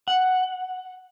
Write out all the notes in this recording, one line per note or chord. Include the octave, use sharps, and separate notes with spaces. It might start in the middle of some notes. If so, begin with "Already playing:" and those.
F#5